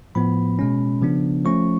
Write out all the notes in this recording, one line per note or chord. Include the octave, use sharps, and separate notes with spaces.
A2 F3 B3 B5
B2 G#3 C#4
C#3 F3 B3 D4
F3 A3 C#4 C#6